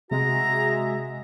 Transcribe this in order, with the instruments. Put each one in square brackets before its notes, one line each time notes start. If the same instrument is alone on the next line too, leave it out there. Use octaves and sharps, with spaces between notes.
[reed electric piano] C3 [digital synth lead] G#3 [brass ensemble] F#4 G#4 E5 [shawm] A#5